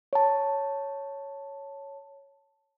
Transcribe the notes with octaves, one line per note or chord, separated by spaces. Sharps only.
C#5 A5